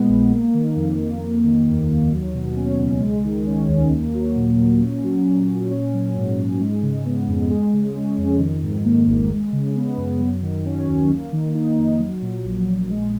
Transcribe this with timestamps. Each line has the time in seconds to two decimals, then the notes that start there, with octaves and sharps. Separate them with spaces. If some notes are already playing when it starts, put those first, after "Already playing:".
Already playing: A#2 G#3 B3
0.09 A#1
0.31 A#3
0.54 D#3
0.76 F2
0.99 F2
1.22 A#3
1.44 D#3
1.67 D#2
1.89 D#2
2.12 F#3
2.34 B2
2.56 C#4
2.78 C#2
3.01 G#3
3.24 D#3
3.46 C#4
3.68 D#2
3.90 A#3
4.14 F#3
4.36 A#2
4.58 A#2
4.81 C#4
5.04 F#3
5.25 A#2
5.49 A#2
5.71 C#4
5.94 F#3
6.16 G#2
6.38 G#2
6.60 G#3
6.83 C#3
7.05 B3
7.28 F2
7.50 G#3
7.73 C#3
7.96 C#4
8.18 F2
8.40 D#3
8.63 G#2
8.85 A#3
9.07 G#1
9.30 G#3
9.52 C#3
9.76 B3
9.97 F#2
10.20 F#3
10.42 D#3
10.65 C#4
10.87 D#2
11.10 A#3
11.32 D#3
11.55 D#4
11.78 F2
11.99 F#3
12.22 A#2
12.44 A#1
12.66 A#1
12.90 G#3